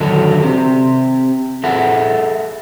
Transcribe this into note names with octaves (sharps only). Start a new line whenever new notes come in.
D3 D#3 F#3 D4 A4
C4 G4
G#4 A4 E5 F#5